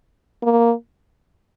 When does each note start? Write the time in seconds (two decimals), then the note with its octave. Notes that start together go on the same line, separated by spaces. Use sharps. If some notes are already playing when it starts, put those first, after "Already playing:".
0.43 A#3